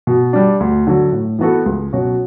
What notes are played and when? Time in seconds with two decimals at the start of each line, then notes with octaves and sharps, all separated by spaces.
0.07 B2
0.33 G3 D4
0.60 D2
0.87 D3 F#3
1.12 A2
1.39 E3 B3 F#4 A4
1.66 C#2
1.93 B2 F#3 C#4 F#4